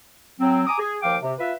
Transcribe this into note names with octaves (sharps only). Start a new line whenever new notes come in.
F#3 C4
G#5 A#5 D6 D#6
G#4
D#2 F3 F5 G5 D6
C3
F4 B4 E5